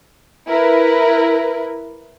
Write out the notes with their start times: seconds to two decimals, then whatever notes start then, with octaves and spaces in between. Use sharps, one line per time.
0.47 E4 A#4 B4